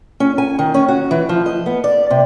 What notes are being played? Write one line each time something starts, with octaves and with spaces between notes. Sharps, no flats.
C#4
G#5
D#3
C#4
F#4
E3
F3
D#5
B3
D5
C3